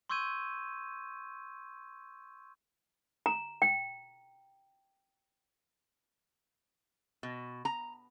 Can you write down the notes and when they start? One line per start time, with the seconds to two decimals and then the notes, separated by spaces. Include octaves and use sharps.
0.10 C6 C#6 E6 G6 G#6 D#7
3.26 A#5
3.62 G5
7.23 B2
7.65 A#5